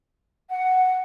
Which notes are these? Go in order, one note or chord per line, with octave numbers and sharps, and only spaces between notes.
F#5